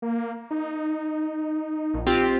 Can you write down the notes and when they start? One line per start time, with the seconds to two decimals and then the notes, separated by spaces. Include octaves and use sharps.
0.02 A#3
0.51 D#4
1.94 A#1
2.07 C4 F4 G4